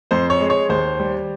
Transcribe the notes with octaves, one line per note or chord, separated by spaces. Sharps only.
F2 C5
C#5
G#3
C#5
D#2 C5
G3